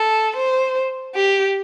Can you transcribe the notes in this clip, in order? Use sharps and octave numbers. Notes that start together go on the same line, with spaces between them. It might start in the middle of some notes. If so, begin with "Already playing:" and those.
Already playing: A4
C5
G4